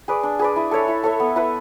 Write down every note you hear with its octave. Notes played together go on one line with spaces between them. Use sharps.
G#4 B4 D5
D4
G#4 B4 D5
E4
A4 C#5 E5
E4
A4 C#5 E5
B3
E4 B4 E5